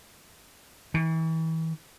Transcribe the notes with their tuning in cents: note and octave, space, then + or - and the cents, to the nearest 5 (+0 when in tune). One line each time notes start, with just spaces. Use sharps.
E3 -35